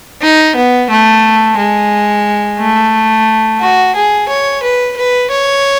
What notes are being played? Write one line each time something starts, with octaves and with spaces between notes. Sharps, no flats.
D#4
B3
A3
G#3
A3
F#4
G#4
C#5
B4
B4
C#5